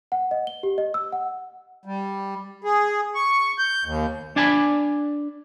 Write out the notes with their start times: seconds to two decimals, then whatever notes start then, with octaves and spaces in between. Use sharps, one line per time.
0.12 F#5
0.31 D#5
0.47 G7
0.63 G4
0.78 D#5
0.94 E6
1.12 F#5
1.85 G3
2.64 G#4
3.15 C#6
3.58 G6
3.85 D#2
4.36 D4 D5 G#5 A5 B5